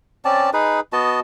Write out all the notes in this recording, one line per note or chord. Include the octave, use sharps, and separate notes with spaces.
C4 C#4 D5 A5
D#4 G#4 B4
B3 F#4 D#5 A5